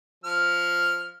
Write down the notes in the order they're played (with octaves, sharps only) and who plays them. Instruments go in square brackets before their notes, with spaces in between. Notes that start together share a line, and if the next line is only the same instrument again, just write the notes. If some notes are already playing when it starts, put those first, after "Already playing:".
[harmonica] F3 F6